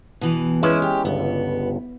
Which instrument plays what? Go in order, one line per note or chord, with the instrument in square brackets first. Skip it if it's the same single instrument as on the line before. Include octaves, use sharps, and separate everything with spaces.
[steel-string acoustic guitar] B2 E3
[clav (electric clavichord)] G#3 C#4 [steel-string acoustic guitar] E4 B4 E5
[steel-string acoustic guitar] G4
[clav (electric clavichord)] G1 C#2 [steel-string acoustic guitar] B3